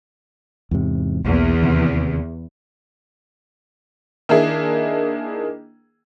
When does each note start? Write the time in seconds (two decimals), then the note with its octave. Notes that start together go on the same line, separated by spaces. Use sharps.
0.71 E2 G#2 C3
1.24 B1 E2 A#3
1.63 D#2 C3
4.29 D#3 A#3 D4 E4 G#4